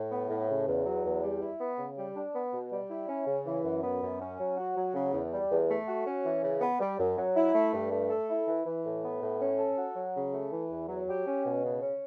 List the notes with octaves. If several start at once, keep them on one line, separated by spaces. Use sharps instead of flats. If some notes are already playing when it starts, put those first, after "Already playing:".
Already playing: A2
B3
A2
C#3
E2
F#3
E2
G3
E4
B3
C#3
G3
D4
B3
B2
G3
E4
C#4
C#3
E3
F#2
B3
F#2
C#4
F#3
F#4
F#3
C#3
E2
G3
E2
A3
F#4
C#4
E3
C#3
B3
G3
F#2
F#3
E4
A3
G2
A3
A4
E4
E3
E3
A2
B3
A2
C#4
A4
F#4
F#3
C#3
A3
E3
E2
F#3
G4
C#4
B2
C#3
C#4